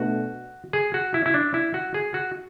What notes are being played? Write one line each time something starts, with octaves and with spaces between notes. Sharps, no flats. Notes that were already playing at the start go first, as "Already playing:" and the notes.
Already playing: B2 A3 D4 F#4
G#4
F#4
E4
E4
D4
E4
F#4
G#4
F#4